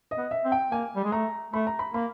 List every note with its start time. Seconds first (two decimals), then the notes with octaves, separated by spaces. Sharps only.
0.11 D#5
0.17 B3
0.31 E5
0.45 C4
0.52 G5
0.72 A#3 G#5
0.96 G3
1.04 G#3
1.12 A3 A#5
1.54 A3 B5
1.67 A#5
1.79 B5
1.94 A#3 B5